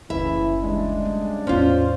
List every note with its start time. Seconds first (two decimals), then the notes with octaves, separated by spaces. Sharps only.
0.10 F#1 D2 C#3 E3 E4 E5
0.62 C#3 G3 G#3 D4
1.05 F#3 A3
1.47 A1 E2 C#4 F4 C5